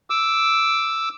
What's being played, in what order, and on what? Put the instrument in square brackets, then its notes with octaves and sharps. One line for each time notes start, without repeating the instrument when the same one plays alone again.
[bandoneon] D6 E6